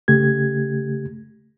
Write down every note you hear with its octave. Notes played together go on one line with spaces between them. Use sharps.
C#3 A3 G4 G#6